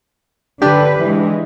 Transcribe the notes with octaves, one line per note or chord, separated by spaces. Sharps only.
D3 D4 G4 B4
E3 G#3